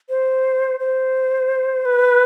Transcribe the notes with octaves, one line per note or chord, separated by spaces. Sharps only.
C5
C5
B4